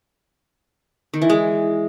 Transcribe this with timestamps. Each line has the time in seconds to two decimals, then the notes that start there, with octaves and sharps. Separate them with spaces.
1.14 D#3
1.22 E3
1.30 G#3